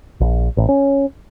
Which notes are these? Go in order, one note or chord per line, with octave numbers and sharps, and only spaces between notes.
A#1
A1
C#4